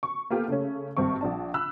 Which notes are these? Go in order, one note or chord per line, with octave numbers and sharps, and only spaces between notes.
C#6
A#3 B3 F4 G4 A4
C#3 A3 C#4
G#1 G2 C4 C#6
A#1 D4 A5
B5 E6 F#6